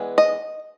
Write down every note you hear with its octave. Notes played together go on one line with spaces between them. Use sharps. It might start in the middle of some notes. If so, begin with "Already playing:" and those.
Already playing: E3 G#3 B3 D4
D#5